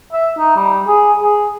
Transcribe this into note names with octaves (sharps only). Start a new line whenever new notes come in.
E5
D#4
G3
G#4
G#4